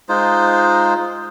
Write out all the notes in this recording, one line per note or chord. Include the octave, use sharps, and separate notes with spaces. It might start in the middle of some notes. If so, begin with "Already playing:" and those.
G#3 D#4 F4 C5